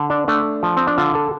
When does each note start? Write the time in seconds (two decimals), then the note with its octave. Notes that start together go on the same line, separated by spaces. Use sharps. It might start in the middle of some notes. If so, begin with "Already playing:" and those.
Already playing: D3
0.10 D4
0.28 A3 D4
0.63 F3
0.77 C4
0.87 D4
0.97 D3 F4
1.15 A4